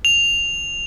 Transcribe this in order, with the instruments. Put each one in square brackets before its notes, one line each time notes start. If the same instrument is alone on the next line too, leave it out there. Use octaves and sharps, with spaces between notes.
[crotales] F7